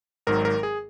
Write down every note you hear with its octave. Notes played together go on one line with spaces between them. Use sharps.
G#1 G#2 D#3 F#3 A#4
A#4
G#4